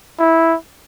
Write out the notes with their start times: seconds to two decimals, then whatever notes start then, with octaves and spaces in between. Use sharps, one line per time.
0.19 E4